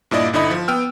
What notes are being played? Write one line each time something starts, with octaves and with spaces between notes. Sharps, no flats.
G2 A#2 E4 D5 D#5
G1 D3 D#4 E4 D#5 B5
F3
B3 G5 E6 F6